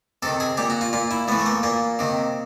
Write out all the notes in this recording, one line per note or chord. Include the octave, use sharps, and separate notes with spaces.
C3 D#3 A4
G#4
A#2 G4
F#4
F4
A#2 F4
E4
A2 E3 B3
A3
A#3
A#2 A#3
C3 D#3